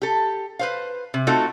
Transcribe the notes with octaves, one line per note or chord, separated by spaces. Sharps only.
G4 A4
B4 C5 F5
C3
A3 C4 D#4 F4 F#4 A4